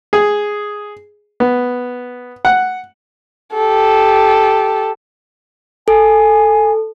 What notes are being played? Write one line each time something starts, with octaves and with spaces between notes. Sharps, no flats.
G#4
B3
F#5
G4 A4
A4 G#5